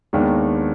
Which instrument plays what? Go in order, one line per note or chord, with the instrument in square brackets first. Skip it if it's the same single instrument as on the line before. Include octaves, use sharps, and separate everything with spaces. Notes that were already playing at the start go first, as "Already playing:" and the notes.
[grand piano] D#2 D#3 G#3 B3 D4